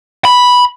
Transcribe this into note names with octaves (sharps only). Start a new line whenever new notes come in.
B5